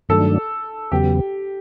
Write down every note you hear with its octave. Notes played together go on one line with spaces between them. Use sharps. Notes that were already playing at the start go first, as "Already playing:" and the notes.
G2 D#3 F#3 A3 D4 A4
E2 C#3 F#3 B3 G4